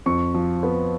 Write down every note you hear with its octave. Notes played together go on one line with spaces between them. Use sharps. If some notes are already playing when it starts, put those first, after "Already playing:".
F2 C#6
F3
B3